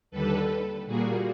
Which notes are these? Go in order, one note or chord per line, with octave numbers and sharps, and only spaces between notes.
D#2 D3 G3 A4 B4
A#2 G3 A#3 F#4 G#4